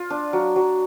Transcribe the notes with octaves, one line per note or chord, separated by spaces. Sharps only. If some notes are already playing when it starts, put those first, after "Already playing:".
Already playing: F4
D4
F#3
F#3